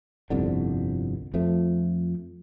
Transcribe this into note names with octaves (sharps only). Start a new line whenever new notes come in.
G1 C2 F2 D3
F2 F3 A3